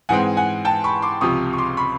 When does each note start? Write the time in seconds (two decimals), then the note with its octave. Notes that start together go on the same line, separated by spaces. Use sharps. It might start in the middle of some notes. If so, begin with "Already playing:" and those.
0.09 G#2 E3 G#3 C4 F#5 G#5
0.37 F#5 G#5
0.65 G5 A5
0.84 B5 C#6
1.02 C6 D6
1.21 C#2 C3 F3 C#6 D#6
1.53 C#6
1.58 C6 D6
1.77 B5 C#6